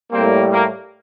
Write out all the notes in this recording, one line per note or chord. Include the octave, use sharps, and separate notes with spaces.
A2 G3 A#3 C4
A#3